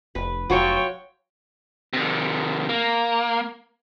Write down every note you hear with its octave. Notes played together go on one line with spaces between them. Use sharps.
F1 B4
F1 F#3 F4 F#4 C#5 G5
C3 D#3
A#3